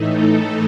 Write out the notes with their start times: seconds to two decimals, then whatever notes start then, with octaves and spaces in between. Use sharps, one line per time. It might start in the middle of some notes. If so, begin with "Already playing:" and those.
Already playing: A2 E3 A3 D#4
0.14 A4